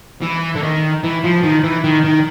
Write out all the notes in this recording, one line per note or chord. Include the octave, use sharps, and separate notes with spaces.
E3
D3
D#3
E3
F3
D#3
E3
D#3
D#3